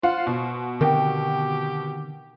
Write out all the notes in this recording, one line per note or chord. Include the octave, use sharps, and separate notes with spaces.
F4 C5 F5 F#5
B2
D3 D#3 C4 G4 A#4 G5